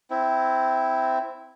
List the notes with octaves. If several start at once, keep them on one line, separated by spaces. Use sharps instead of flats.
C4 E4